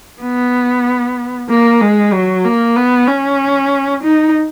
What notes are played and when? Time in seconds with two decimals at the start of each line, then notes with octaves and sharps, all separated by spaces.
0.22 B3
1.49 A#3
1.81 G#3
2.13 F#3
2.44 A#3
2.76 B3
3.08 C#4
4.03 D#4